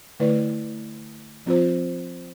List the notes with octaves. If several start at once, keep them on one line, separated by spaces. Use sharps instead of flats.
D3 A3 E4 B4 D5
F3 C4 F4 C5